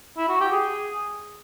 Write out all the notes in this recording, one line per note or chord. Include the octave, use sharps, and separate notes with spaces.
E4
F#4
G4
G#4